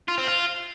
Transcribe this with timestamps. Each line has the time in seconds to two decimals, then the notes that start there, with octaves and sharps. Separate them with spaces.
0.08 F4
0.18 C4
0.27 F4